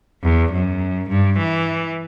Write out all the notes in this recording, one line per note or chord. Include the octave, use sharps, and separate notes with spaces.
E2
F#2
G2
E3